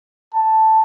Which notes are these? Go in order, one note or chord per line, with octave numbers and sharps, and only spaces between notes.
A5